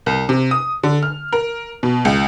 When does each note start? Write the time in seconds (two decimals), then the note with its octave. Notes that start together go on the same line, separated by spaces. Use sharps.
0.06 C2
0.29 C3
0.51 D#6
0.83 D3
1.03 F6
1.33 A#4
1.83 B2
2.05 C#2